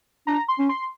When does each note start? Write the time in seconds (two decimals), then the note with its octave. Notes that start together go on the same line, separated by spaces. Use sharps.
0.27 D4 A#5
0.48 C6
0.59 C#4
0.69 C6